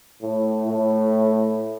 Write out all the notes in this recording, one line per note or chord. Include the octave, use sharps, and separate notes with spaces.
A2
A2